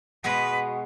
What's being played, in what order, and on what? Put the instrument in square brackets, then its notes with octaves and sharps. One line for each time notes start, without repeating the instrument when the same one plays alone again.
[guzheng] B2 G#3 B3 [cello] B4